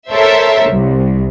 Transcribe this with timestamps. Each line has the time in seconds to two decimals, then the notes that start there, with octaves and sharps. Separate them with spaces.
0.11 A4 A#4 C5 C#5 E5
0.69 C2